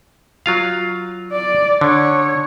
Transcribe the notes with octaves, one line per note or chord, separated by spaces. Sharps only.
F#3 F4 F5
D5
D3 C#5